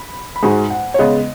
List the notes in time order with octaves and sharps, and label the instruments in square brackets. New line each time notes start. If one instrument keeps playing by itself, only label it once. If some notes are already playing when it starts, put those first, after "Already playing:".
Already playing: [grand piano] B5
B5
[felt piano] G#2 G#3 D#4 F#4 [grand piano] G#5
[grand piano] F#5
C#5
[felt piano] C#3 G#3 B3 [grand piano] D#5